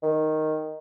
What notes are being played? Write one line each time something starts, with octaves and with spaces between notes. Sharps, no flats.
D#3